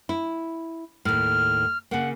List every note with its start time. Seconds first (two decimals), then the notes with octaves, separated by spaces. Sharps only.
0.09 E4
1.05 D#2 A2 F6
1.91 C#3 A#3 F#5